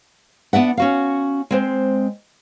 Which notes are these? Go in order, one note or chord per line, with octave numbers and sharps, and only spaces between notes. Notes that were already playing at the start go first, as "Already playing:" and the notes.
B3 D4 E5 F#5
C#4 F#4 F5
G#3 C4 C5